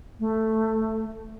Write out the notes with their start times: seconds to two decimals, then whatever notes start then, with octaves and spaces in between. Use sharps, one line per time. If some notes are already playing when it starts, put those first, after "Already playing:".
0.20 A3